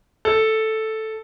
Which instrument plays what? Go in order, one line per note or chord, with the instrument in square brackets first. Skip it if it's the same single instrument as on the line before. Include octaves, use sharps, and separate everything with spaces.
[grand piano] A4